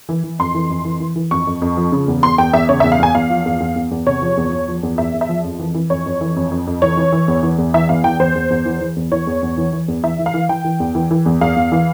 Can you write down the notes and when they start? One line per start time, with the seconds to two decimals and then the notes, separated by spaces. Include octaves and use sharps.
0.09 E3
0.24 E3
0.39 F2 C6
0.55 E3
0.70 F2
0.85 E3
1.00 E3
1.16 E3
1.31 F2 C#6
1.47 F2
1.62 F2
1.77 F3
1.92 C#3
2.08 E2
2.23 E2 C6
2.38 E2 G5
2.53 E2 E5
2.69 C#3 C#5
2.80 E5
2.84 E2
2.92 F5
2.99 E2 G#5
3.15 E2 F5
3.30 F3
3.45 E2
3.60 E2
3.76 E2
3.91 E2
4.06 C3 C#5
4.22 F3
4.37 E2
4.53 E2
4.68 F3
4.83 E2
4.98 E2 E5
5.14 E2
5.21 E5
5.29 F3
5.44 F2
5.59 E3
5.75 E3
5.90 F2 C#5
6.06 F2
6.21 E3
6.36 F2
6.51 F2
6.67 F2
6.82 E3 C#5
6.97 E3
7.12 E3
7.28 E2
7.43 E3
7.58 E2
7.74 E3 E5
7.89 E2 F5
8.04 E3 G5
8.19 E2 C5
8.35 E2
8.50 E2
8.65 E3
8.81 E3
8.96 E2
9.12 E3 C#5
9.27 E2
9.42 E2
9.57 E3
9.73 E3
9.88 E2
10.03 E3 E5
10.19 E3
10.26 F5
10.34 E3
10.49 E3 G5
10.65 E3
10.80 E2
10.95 E3
11.11 E3
11.26 E2
11.41 E2 F5
11.56 E2
11.72 E3